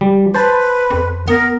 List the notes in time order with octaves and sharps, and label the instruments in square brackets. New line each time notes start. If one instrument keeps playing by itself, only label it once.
[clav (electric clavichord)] G3
[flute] B4 [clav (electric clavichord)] C5 A5
[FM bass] F2
[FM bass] B3 [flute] A#4